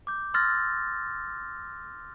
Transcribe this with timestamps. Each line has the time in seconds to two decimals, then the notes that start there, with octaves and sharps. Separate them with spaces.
0.07 D6 G6
0.34 C6 E6 F6 A6 A#6